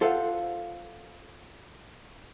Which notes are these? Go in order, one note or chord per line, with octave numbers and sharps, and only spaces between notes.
F4 A4 C5 F5 F#5